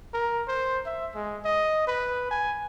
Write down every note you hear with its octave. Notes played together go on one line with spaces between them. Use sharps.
A#4
C5
E5
G#3
D#5
B4
G#5